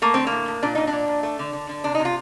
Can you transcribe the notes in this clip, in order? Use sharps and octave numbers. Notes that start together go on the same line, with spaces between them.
A3 A#3
D3 C4
A#3
A2
A2
A#2 D4
A#2 D#4
D4
A#2
A#2
A3
D3
D3
D3
C3 D4
C3 D#4
F4